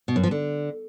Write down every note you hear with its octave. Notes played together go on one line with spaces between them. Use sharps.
B2
F#2
F3
D3